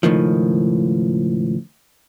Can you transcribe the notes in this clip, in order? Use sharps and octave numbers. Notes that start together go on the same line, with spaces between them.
C#2 A2 D#3 F3